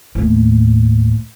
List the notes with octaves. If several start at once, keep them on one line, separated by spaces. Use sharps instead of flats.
D#2 A2